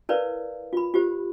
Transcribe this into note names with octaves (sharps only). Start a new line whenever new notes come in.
E4 A#4 B4 C#5 D5 F5
F4 B5
F4 G4 C5